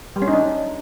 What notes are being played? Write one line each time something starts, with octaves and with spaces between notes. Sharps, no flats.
G3
C#4
D#4
D4